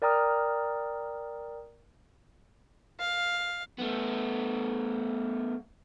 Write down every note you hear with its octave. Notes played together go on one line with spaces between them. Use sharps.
A#4 D5 G5 A#5 D#6 F6
F5
A3 B3